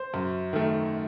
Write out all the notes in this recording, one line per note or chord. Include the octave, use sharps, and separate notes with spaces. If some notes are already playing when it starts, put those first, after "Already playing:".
Already playing: C5
F#2
D#3 A3